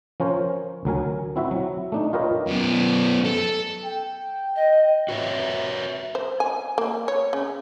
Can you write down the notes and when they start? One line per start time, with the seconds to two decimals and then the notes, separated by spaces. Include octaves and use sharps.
0.20 F3 C#4 A#4 C5 C#5
0.85 D2 F#3 A#4 G#5
1.36 C4 E4 F#4 E5
1.51 F#3
1.92 A3 D4 D#4
2.13 F4 G4 A#4 B4 C#5 D#5
2.47 F#2 B3
3.25 A4
3.85 G5
4.56 D#5
5.09 F#4 B4 C#5 E5
6.15 C5
6.40 G#5
6.78 A#3
7.08 C#5
7.33 C#3